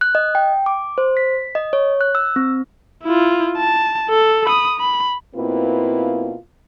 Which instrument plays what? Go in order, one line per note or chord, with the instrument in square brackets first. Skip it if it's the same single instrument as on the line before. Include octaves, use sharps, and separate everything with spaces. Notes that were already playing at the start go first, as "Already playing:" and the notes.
[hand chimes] F#6
D#5
G5
D6
C5
B6
D#5
C#5
F#6
E6
C4
[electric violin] E4 F4
A5
A4
B5 D#6
B5
[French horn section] B2 A#3 C4 E4 F4 B4